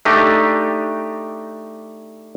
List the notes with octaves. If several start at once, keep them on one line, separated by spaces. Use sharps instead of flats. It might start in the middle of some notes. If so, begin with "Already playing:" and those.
A3 D4 D#4 G4 D5 D#5